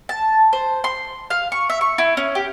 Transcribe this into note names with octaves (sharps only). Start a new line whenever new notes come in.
A5
C5
C6
F5
C#6
E5
C#6
E4
C#4
G4